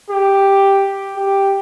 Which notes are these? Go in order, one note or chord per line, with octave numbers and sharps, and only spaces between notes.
G4
G4